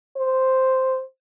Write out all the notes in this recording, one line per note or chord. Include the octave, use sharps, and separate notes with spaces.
C5